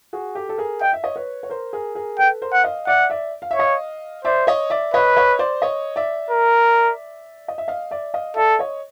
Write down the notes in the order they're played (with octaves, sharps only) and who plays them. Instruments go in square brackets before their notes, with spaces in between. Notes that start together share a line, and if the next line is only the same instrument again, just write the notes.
[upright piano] F#4 G#4
G4 A4
A4
G#4 A#4
[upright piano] D#5 [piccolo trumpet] G5
[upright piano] E5
C#5 D#5
B4 C#5
C#5
A#4 C5
G#4 A#4
G#4 A#4
[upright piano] A4 B4 [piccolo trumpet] G5
[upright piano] A#4 C5
[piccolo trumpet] F#5
[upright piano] D#5 F5
[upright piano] D5 E5 [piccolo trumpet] F#5
[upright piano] D5 E5
F5
E5
[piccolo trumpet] C#5 [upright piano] D#5 F5
[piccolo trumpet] C5 [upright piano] D5 E5
[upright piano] C#5 D#5
D5 E5
[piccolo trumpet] B4 [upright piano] C#5 D#5
[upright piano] C#5 D#5
C5 D5
C#5 D#5
D5 E5
[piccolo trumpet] A#4
[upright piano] D#5
E5
D#5 F5
D5 E5
D#5 F5
[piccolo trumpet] A4 [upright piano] D5 E5
[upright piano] C#5 D#5